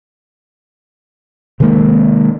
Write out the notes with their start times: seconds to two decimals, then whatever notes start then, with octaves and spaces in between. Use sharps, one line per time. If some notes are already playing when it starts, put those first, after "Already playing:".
1.60 C3 D#3 G#3 A#3